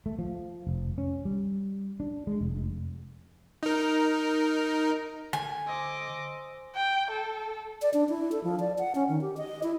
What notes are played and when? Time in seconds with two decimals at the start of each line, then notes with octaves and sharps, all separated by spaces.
0.06 A3
0.19 F3
0.67 F1
0.98 C#4
1.25 G3
2.00 D4
2.27 G#3
2.41 F1
3.63 D#4 A#4
5.33 D3 G#5
5.67 C5 D#5 C6 D6 E6
6.76 G5
7.11 A4
7.82 D5
7.94 D4
8.09 E4
8.32 A4
8.44 F3
8.60 D5
8.79 F#5
8.95 C#4
9.09 D#3
9.21 G4
9.37 D#5
9.63 E4